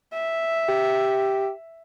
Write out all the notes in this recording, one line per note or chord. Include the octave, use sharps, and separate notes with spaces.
E5
G4